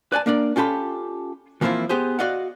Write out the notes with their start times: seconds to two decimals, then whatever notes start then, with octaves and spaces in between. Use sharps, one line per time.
0.12 B4 D5 G#5 A5
0.26 A#3 D4 A#4 D5
0.56 C#4 F4 G4 A4 B5
1.61 E3 F3 A#3 C4 E4 F4
1.89 B3 G4 G#4 C5
2.19 F#4 D5 D#5 F5 F#5